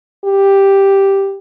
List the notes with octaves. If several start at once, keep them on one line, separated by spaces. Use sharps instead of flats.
G4